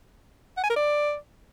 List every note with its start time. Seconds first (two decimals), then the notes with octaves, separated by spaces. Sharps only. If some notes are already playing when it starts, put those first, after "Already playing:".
0.57 F#5
0.64 G#5
0.70 A#4
0.76 D5